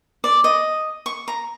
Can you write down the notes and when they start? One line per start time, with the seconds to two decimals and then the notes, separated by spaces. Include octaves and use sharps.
0.24 D5
0.44 D#5
1.06 C#6
1.28 A#5